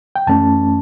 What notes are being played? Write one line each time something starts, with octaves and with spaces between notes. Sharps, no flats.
G5
F#2 E3 A3 C#4 A5